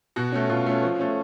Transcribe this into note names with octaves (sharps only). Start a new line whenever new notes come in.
B2 F#4
A3 C#4
B2 F4
A3 C#4
F3
A3 C#4